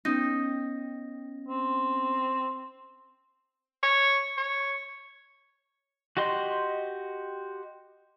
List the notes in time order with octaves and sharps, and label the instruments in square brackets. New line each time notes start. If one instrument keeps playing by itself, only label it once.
[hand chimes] B3 C#4 A#6 [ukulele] D#4
[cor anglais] C4
[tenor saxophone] C#5
C#5
[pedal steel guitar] F#4 G4 D#5 C6